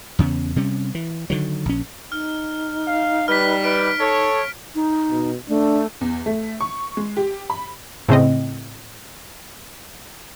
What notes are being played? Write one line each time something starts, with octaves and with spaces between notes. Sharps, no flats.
E2 C#3 B3
C3 G3 C#4
E3
D3 D#3 F#3
A#1 C#4
D#4 F6
F5
G3 B4 F6 B6
B4 D7
A4 C#5
D#4
B2
A3 D4
E2
A3
C#6
G#3
G4
B5
A2 C#3 C4 D#5